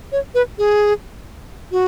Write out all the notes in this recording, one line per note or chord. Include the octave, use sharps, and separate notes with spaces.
C#5
B4
G#4
F#4